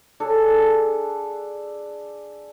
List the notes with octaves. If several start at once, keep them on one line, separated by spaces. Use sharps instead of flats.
D4 G#4 A4